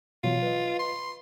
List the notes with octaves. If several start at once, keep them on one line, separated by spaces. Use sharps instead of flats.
B2 E3 F#3 F4
B4 D#5
C6